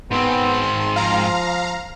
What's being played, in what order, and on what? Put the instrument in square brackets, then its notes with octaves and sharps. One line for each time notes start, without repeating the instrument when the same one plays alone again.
[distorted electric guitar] G#2 C4 [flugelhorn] B3 [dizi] C6
[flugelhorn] F3 [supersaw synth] F5 A#5